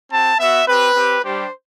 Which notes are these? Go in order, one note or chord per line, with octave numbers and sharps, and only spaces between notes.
C4 F#4 A5
B3 F#4 E5
C4 G4 B4
C4 G4
G3 D4 G4 C5